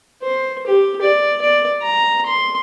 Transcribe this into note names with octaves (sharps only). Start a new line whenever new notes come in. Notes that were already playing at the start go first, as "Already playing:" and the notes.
C5
G4
D5
D5
A#5
C6